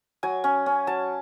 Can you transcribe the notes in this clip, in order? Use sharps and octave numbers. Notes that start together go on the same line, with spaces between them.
F#3 G#5
C#4
C#4
F#3 A5